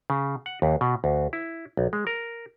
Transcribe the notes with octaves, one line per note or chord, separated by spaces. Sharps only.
C#3
F#5
D#2
B2
D2
E4
B1
G#3
A#4